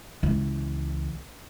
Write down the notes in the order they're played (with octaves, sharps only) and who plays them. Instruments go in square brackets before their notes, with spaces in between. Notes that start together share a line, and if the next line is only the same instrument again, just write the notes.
[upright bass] C#2 E3